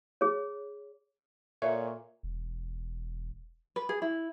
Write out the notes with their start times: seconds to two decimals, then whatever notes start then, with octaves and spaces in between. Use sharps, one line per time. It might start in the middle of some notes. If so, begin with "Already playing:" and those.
0.21 G#4 C#5
1.62 A#2 A4 C#5 D5 E5
2.23 E1
3.76 B4
3.89 G#4
4.02 E4